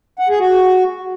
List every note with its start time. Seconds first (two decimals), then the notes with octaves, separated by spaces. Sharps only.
0.19 F#5
0.29 G#4
0.39 F#4